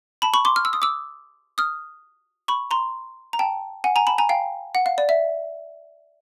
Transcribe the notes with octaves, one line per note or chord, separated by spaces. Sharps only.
A5 B5
B5 C#6
C6 D6
F6
E6
D#6
D6 E6
D#6 F6
B5 C#6
A#5 C6
A#5
G5 A5
F#5 G#5
G#5 A#5
A5 B5
G#5 A#5
F5 G5
F#5
F5
D5
E5